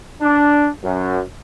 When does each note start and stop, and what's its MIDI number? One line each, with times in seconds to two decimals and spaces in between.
0.21 0.67 62
0.82 1.19 42